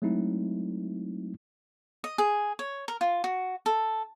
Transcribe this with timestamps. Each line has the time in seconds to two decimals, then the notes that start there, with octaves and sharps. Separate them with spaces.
0.02 F#3 G#3 A3 C4 D#4 E4
2.04 D#5
2.18 G#4
2.59 C#5
2.88 A#4
3.01 F4
3.24 F#4
3.66 A4